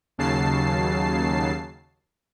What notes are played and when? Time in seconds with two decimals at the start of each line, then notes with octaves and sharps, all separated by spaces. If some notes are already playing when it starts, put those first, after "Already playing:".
0.18 D#2 C#3 F#3 A5 C7